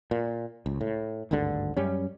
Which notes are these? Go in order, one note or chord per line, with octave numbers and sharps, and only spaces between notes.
A#2
C#2
A2
G#1 D2 G2 D3
F#2 G3 C#4